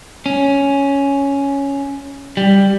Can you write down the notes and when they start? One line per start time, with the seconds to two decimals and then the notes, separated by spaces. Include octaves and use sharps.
0.26 C#4
2.37 G3